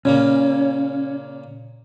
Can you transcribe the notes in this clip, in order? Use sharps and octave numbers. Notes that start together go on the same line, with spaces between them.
A#2 C#3 A#3 C#4